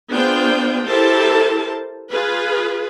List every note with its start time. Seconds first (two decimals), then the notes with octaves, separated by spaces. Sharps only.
0.11 B3 D4 F4 G#4 C5 G5
0.88 E4 G4 A4 A#4 C5 A5
2.11 F4 G#4 B4